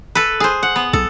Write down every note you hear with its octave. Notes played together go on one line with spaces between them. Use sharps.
A4 B4
G#4 C5
F#5
B3
B1 A4